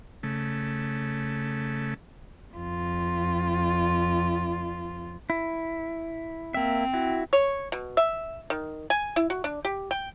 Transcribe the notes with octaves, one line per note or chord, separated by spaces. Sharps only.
C#3 A3
F2 F4
E4
A#3 C4 E5
E4 F#4
C#5
B2
E5
D#3
G#5
E4
F#4
D4
G4
G5